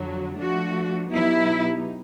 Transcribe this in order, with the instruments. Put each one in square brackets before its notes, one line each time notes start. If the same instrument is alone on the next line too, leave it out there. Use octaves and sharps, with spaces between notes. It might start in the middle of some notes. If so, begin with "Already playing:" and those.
Already playing: [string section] F2 D3 F#3
[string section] F3 A3 D4 [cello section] F#4
[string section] B2 F#3 B3 D#4 G4 [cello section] E4